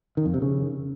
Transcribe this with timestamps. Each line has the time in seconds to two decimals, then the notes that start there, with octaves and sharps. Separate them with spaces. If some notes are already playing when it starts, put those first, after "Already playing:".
0.17 D#3
0.25 F2
0.34 C3
0.42 C#3